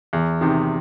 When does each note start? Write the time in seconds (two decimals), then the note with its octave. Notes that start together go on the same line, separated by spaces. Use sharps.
0.13 E2
0.41 C3 D#3